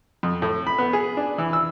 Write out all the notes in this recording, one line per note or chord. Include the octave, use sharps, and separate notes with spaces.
F2
A2
B5
B3
G#4
D4
E3
E6